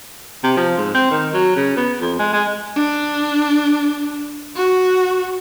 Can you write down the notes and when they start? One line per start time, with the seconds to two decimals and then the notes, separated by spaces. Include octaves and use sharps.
0.43 C3
0.57 F3
0.78 G#2
0.94 C4
1.11 D#3
1.33 F#3
1.56 C#3
1.77 B3
2.01 F2
2.19 G#3
2.33 G#3
2.76 D4
4.56 F#4